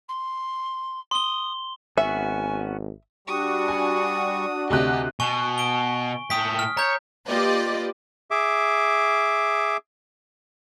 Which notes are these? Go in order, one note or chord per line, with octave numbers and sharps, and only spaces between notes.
C6
C6 D#6 G7
G#1 B3 C#4 F#4 E5 G#5
G3 D4 F#4 C#6 D#6
G#5
D2 C3 G4 D#5 F#6
B2 G#5 C#6 G7
D7 G7
A2 G5 D#6 B6
F6
C#5 A#5 G6
A#3 F4 G4 B4 D5 D#5
G#4 E5 D6